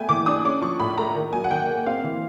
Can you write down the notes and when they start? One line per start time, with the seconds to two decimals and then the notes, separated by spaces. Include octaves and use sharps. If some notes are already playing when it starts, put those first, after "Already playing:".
Already playing: A3 B3 G5 G#5
0.09 E3 D6
0.26 D4 D#6
0.45 C#4 D6
0.62 F3 C#6
0.80 A2 B5
0.98 A3 A#5
1.15 D#3
1.33 F#3 G#5
1.44 F#5
1.50 D#3 G5
1.69 A#3
1.86 C4 F5
2.04 E3